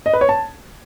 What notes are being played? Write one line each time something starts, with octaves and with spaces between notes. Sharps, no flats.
D#5
B4
C#5
A5